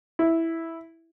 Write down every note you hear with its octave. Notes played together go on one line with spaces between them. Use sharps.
E4